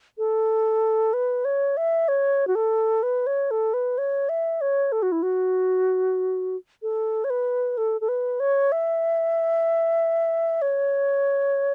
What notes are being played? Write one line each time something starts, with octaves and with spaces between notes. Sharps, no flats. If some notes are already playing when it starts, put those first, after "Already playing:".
A4
B4
C#5
E5
C#5
F#4
A4
B4
C#5
A4
B4
C#5
E5
C#5
A4
F#4
E4
F#4
A4
C#5
B4
A4
A4
B4
C#5
E5
C#5